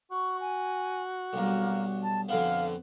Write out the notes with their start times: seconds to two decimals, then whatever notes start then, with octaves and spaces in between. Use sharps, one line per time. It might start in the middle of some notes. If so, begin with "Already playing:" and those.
0.11 F#4 C#6
0.40 G#5
1.33 B1 G2 A#3
2.02 A5
2.29 F2 B2 D3 B3 F5